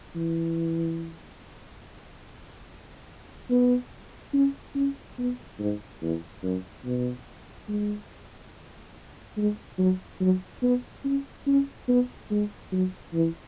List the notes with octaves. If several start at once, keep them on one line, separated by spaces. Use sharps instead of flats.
E3
B3
C#4
C#4
B3
G#2
E2
F#2
B2
G#3
G#3
F#3
F#3
B3
C#4
C#4
B3
G#3
F#3
E3